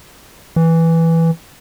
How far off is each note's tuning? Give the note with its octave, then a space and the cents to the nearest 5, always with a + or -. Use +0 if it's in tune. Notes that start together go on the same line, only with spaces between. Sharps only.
E3 +0